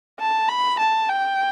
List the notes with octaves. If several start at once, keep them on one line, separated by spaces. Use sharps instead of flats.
A5
B5
A5
G5